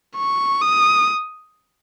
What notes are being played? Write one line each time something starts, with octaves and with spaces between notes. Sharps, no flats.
C#6
D#6